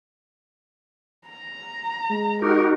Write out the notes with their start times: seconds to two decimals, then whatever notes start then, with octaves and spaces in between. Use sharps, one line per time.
1.28 A#5
2.10 G#3
2.42 D#4 F#4 G4 A#4